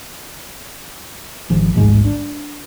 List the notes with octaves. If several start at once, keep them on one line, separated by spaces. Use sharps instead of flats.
G#1 F3
A1 D2 G#2 G#3
D4